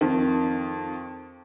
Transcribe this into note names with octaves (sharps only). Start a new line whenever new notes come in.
F2 D#3